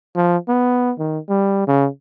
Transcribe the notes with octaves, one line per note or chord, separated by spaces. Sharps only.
F3
B3
D#3
G3
C#3